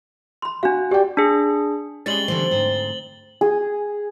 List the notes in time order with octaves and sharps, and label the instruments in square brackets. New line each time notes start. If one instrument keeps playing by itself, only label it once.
[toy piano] B5 C6
[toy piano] D4 F5 [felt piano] F#4
[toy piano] G4 [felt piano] D5 G5
[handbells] D4 G#4
[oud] G3 G#3 C#4 [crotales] A6 F#7 G7
[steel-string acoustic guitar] D3 E3 G3 [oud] C4
[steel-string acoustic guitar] D2 G#2 C5
[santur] G#4